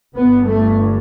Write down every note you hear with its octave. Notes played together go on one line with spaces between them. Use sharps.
G1 G2 B3
A3